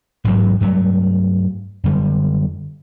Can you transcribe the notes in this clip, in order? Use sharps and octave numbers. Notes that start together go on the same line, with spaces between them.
A1 G#2 F#3
G2 F#3 G3 A3
F#2 D3 G3